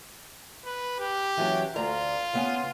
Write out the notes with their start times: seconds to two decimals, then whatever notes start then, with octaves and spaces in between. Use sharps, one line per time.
0.65 B4
1.00 G4
1.37 E3 F#3 C#4
1.76 D2 F4 D5 A#5
2.33 C#3 B3 G#5